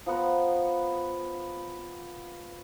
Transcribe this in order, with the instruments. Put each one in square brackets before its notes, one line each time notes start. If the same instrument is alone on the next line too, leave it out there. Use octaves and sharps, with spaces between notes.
[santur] F3 B3 F#5 A#5